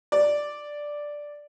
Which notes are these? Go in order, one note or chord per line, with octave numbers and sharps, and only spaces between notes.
D5